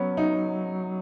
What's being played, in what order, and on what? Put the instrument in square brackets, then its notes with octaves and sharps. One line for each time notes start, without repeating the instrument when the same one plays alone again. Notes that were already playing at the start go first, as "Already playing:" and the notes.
Already playing: [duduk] F#3 [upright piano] B3 C#4
[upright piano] D#4